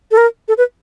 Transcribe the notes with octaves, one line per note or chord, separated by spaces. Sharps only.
A4
A#4
A4
B4